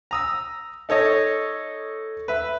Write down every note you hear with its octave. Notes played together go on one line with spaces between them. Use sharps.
A#5 D#6 E6
D#4 A4 C#5 D#5
B4 E5